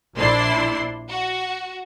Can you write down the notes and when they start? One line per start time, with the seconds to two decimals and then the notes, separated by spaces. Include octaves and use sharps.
0.16 A#1 D4 E4 C6 C7
1.09 F#4